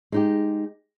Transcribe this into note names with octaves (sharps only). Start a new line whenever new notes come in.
G#3 D#4 G4